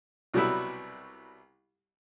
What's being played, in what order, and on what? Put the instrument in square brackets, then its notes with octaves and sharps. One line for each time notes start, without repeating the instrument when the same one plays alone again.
[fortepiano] C2 B2 F#3 G3 B3 E4